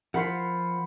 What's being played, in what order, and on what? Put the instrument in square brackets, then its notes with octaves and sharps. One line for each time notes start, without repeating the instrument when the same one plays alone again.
[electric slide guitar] F3 [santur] F#5 B5 C6